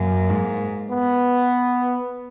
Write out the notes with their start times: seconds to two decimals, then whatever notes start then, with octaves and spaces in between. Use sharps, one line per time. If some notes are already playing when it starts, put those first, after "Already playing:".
Already playing: F#2 A#3
0.30 G#2
0.90 B3